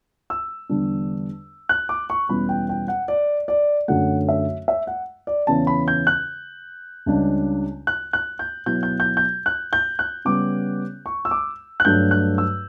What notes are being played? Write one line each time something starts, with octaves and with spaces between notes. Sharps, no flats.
E6
E2 D3 G3 D4
F#6
D6
C#6
E2 B2 G3 C#4 E4 B5
G5
G5
F#5
D5
D5
F#2 D3 F#3 A3 F#5
E5
E5
F#5
D5
E2 C#3 E3 A5
B5
G6
F#6
C#2 C#3 G3 D4
F#6
F#6
G6
B2 F#3 B3 E4 G6
G6
G6
G6
F#6
G6
F#6
C#3 G3 B3 D6
C#6
E6
D6
F#6
G2 F#3 A3 D4 G6
F#6
E6